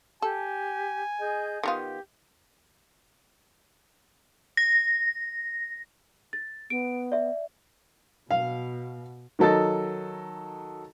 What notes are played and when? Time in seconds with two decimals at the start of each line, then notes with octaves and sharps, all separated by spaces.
0.22 G4 A4 G#5
1.20 G#4 D#5 G6
1.63 D#3 B3 F4 G4
4.57 A#6
6.33 A6
6.70 B3 D7
7.12 D5 E5
8.31 B2 F5
9.39 D#3 F#3 A4 D#5 A6